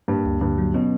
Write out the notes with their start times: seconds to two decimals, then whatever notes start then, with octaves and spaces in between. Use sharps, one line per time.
0.08 G2 A#3
0.26 D2
0.41 G2 D3
0.58 F#3
0.74 B2 C#4